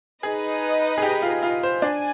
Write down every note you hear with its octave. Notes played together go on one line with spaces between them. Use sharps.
D#4 G#4 B4 D#5
G#4
G4
F4
F4
C5
D4 G#5